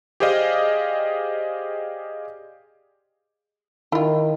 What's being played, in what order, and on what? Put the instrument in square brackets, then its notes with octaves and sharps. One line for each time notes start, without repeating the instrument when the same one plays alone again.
[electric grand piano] G4 G#4 C5 D5 D#5 F5
[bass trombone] D#3 [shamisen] E4 F4